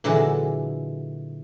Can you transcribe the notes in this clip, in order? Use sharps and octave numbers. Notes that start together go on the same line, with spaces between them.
A#2 D3 E3 F#3 G#3 A5